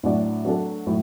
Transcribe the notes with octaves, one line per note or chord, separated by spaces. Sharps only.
A2 F#3 D4 F#4 D5
F#3 A3 D4 F#4 A4
A2 F#3